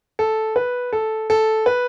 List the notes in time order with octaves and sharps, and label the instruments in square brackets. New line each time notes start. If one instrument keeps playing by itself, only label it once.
[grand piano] A4
B4
A4
A4
B4